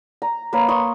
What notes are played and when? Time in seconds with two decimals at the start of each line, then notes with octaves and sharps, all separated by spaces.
0.22 A#5
0.53 A#3 B4 C#5
0.68 C6 C#6 D#6